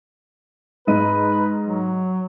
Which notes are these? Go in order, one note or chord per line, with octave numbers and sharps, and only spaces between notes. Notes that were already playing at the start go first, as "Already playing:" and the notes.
G#2 B4 D#5 D#7
F#3